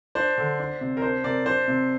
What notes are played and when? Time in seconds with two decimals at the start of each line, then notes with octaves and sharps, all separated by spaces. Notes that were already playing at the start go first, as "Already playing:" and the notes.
0.15 D4 C5
0.38 D3
0.59 D4
0.81 C3
0.97 A#4
1.02 D4 C5
1.24 C3 A#4 D5
1.46 D4 C5
1.68 C3